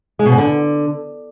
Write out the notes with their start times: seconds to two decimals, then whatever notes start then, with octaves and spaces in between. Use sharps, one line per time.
0.19 G#3
0.26 B2
0.32 G#2
0.38 D3